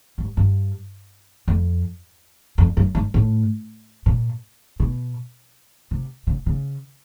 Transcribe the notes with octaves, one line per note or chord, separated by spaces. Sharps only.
G2
G2
F2
F2
F#2
G2
A2
A#2
B2
C3
C#3
C#3